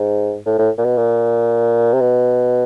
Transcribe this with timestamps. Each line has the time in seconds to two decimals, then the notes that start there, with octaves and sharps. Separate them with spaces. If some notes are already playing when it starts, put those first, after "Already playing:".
Already playing: G#2
0.46 A2
0.59 A2
0.78 A#2
0.85 B2
0.98 A#2
1.93 C3
2.01 B2